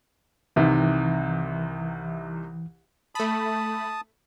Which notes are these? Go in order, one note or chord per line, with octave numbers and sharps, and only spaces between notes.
C2 C3 D#3 E3
A3 A5 B5 D#6